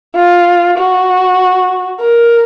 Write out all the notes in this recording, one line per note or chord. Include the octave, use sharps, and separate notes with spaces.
F4
F#4
A#4